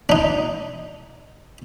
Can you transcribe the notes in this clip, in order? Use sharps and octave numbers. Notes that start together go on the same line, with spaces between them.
D4 D#4